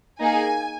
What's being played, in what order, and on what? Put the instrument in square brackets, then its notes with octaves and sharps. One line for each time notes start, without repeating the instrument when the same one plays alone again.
[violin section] A#3 D#4 G#4 G#5